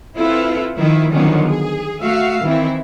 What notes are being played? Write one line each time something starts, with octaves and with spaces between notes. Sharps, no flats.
C4 E4 F4 A4 B4
D#3 F3 E4
D3 D#3 F3 F#3 B3 C#4
G#4
A3 F#4 E5 F5
D#3 E3 C4 E4